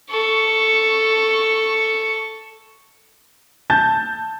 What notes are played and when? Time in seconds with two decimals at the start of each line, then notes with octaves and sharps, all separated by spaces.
0.10 A4 C#6
3.70 A5 G6 A6